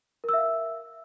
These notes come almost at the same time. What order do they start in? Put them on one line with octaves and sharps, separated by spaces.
A#4 E6 E5 F5